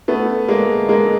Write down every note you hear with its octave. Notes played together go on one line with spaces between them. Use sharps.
A3 B3
G#3 A#3
G#3 A#3